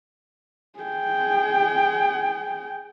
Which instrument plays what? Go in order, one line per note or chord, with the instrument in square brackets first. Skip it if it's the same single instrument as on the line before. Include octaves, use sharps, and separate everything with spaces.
[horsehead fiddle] G#4 G5